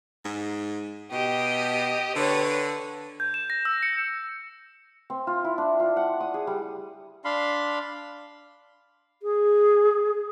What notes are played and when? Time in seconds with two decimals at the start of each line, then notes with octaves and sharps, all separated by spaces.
0.25 G#2
1.12 B2 G4 D#5
2.16 D3 B4 C#5
3.20 G6
3.34 E7
3.50 A#6
3.65 E6
3.83 C#7
5.10 C4
5.27 F4
5.45 E4
5.58 D4
5.80 F4
5.97 F#5
6.21 D#6
6.34 G#4
6.47 G3
7.25 D4 F5 B5 C6
9.22 G#4